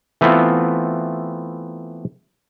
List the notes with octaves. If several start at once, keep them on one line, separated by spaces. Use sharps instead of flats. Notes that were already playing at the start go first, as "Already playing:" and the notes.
E3 A3 B3 C4 E4 F4